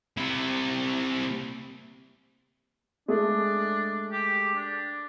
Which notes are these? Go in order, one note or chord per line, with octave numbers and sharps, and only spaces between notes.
C3 E4
G#3 A3 D4 G#4
G4
D4